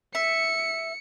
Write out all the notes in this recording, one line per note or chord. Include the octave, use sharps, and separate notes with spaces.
E5 C#7